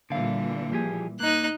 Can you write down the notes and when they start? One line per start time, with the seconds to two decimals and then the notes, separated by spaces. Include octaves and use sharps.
0.10 A#2 D3 E3 G3 F5
0.72 F3 G4 G#4
1.20 A#3 D#4 F#6